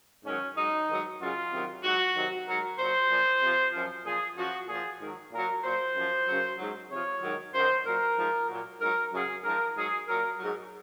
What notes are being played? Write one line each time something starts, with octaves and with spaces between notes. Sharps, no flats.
G#2 D#3 F#3 C#4
G#2 F#3 D#4
G#2 D#3 F#3
F#2 C#3 F#3 F4
C3 D#3 F#3
G#2 F#3 F#4
C3 D#3 F#3
G#2 F#3 A#4
A#2 F#3 C5
A#2 F3
C3 F3
F#2 F3
A#2 F3 G#4
F#2 F3 F#4
A#2 F3 G#4
G#2 D#3 F#3
A#2 F#3 A#4
A#2 F#3 C5
F#2 F3
F#2 C#3 F#3
G#2 F#3
C3 F3 C#5
G#2 D#3 F#3
F#2 D#3 F#3 C5
A#2 F#3 A#4
G#2 F3
A#2 F#3
G#2 F#3 A#4
F#2 C#3 F#3 G#4
G#2 F3 A#4
G#2 F#3 G#4
A#2 F#3 A#4
G#2 F#3